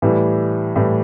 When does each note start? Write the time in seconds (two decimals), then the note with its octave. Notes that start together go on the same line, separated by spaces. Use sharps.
0.02 A2 E3 G3
0.76 A2 E3 G3